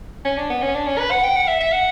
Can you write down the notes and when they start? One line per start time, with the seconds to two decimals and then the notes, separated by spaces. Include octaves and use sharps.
0.25 C#4
0.37 D4
0.50 B3
0.62 C#4
0.74 D4
0.86 C#4
0.98 B4
1.10 F#5
1.23 G5
1.35 F#5
1.47 E5
1.60 E5
1.72 F#5